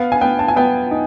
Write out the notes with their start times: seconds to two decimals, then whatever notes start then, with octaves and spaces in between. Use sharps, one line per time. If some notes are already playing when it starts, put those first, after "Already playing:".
Already playing: B3 F5
0.12 G#5
0.21 B3 G5
0.39 A5
0.48 G#5
0.56 B3 G5
0.91 D#4